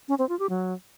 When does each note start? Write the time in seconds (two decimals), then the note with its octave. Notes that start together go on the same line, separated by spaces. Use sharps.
0.08 C#4
0.19 C4
0.29 F4
0.39 G4
0.49 F#3